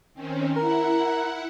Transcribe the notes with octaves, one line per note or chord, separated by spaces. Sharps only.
D#3 C4 C#4
E4 A#4 F#5